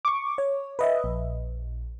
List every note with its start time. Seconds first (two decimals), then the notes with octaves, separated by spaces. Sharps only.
0.05 C#6 D6
0.38 C#5
0.79 B4 D#5 E5
1.04 A#1